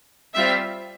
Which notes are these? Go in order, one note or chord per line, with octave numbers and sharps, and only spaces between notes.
G3 C4 F4 E5